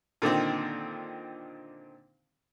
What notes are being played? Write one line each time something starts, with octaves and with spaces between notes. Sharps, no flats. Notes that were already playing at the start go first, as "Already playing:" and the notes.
A#2 D3 D#3 C4